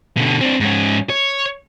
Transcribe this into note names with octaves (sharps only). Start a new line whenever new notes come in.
B2 D3
C4 D4
G#2 C#4
C#5